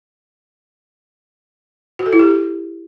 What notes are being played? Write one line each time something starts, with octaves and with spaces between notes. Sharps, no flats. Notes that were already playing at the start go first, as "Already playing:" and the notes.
F#4
A4
E4
G4